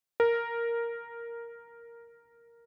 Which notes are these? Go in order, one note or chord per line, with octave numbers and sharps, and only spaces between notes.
A#4